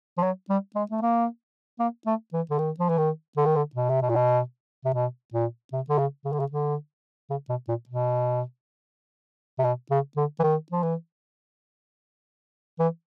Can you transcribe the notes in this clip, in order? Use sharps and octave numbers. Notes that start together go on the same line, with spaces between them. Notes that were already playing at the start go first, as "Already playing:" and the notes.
F3
F#3
G3
G#3
A3
A#3
A#3
A3
E3
D3
D#3
F3
E3
D#3
D3
D#3
D3
B2
C3
B2
A#2
B2
C3
B2
A#2
C3
D3
C#3
C#3
D3
C#3
D3
C#3
B2
A#2
B2
C3
B2
C#3
D3
E3
D#3
F3
E3
E3